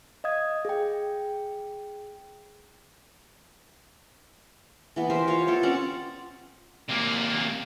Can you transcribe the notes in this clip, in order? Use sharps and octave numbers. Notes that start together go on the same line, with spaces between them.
D#5 F5 D#6 G#6
G#4 G5
E3 B3
G4 A#4 C5 E5
F4 C5 C#5 F5
B3 F4 A4 A#4
C4 C#4 D5 F#5
C3 A#3